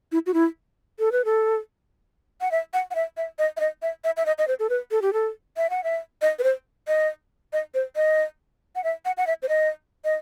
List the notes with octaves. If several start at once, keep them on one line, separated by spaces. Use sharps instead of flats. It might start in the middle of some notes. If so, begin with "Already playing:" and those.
E4
F#4
E4
A4
B4
A4
F#5
E5
F#5
F#5
E5
E5
D#5
E5
D#5
E5
E5
E5
D#5
D#5
C5
A4
B4
A4
G4
A4
E5
F#5
E5
D#5
B4
C5
D#5
D#5
C5
D#5
F#5
E5
F#5
F#5
E5
C5
D#5
D#5